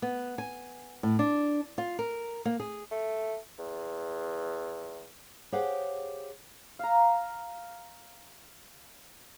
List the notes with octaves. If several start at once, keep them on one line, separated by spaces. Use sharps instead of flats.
B3
G#5
A2
D4
F4
A#4
A#3
G#4
A3
E2
G4 G#4 C5 C#5 F5 F#5
F5 A#5